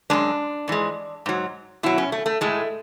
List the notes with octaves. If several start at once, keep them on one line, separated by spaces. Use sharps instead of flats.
F#2 C#3 G#3 D4
G#2 E3 G#3
G#2 F#3
B2 F#3 E4
C#4
A3
A3
A2 G#3 A3